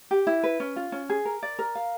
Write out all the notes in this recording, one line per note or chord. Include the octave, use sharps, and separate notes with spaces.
G4
E4
B4
C#4
F4
C#4
G#4
A#4
D5
A#4
F5